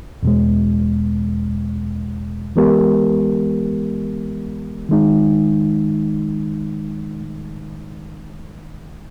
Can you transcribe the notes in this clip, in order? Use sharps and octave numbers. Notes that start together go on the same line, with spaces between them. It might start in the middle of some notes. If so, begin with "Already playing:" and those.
E2 B2 G#3
E3 G#3 B3 G4 A#4
D#3 G#3 D#4